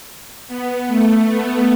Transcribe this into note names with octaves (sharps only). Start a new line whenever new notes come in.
B3
A3
B3